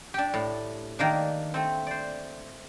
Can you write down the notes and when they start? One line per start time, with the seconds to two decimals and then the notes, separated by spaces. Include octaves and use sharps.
0.14 D4 G4
0.34 A2
0.99 D#3 A#3 D4
1.54 A3 C4
1.87 C5 D5